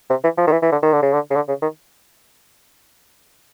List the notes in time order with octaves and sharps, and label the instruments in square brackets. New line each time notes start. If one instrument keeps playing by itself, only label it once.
[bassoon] C3
E3
F3
D#3
E3
E3
D3
D#3
D3
C#3
D3
C#3
D3
C#3
D#3